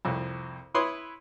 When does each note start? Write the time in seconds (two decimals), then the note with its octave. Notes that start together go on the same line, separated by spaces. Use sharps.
0.05 C2 F2
0.74 E4 B4 C#5 C6 D#6